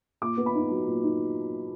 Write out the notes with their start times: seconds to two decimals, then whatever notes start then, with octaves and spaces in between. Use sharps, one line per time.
0.21 A#2 D6
0.37 B3
0.46 B5
0.55 D#4
0.70 F#3
0.87 A#2
1.03 D#4